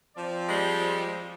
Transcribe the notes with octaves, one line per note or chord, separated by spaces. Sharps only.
F3 C4 D5
G3 G#3